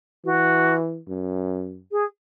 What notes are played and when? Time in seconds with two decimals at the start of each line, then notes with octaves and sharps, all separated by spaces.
0.25 E3 F#4
1.08 F#2
1.91 G#4